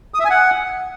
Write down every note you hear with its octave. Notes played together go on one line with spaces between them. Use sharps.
D#6
E5
G#5
F#5